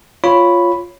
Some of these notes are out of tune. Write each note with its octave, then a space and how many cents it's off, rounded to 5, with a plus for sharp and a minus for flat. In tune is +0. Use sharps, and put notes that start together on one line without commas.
F4 +0 C#5 +0 B5 +0